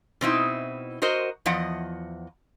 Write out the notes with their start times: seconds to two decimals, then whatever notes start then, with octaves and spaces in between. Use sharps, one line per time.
0.21 B2 C4 D#4 E4
1.02 F#4 A#4 C5 D#5
1.46 E2 F3 D#5 F#5